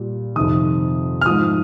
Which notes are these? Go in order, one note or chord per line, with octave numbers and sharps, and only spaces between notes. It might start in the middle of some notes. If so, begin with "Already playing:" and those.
Already playing: A#2 G3
F2 C3 D#3 D#6
F6
G#2 F3 D#6